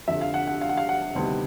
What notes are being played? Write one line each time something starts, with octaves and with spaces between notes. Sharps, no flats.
F1 F2 D3 E5
F5
F#5
F#5
F5
F#5
F5
F#5
D2 C3 D#3 G3 B3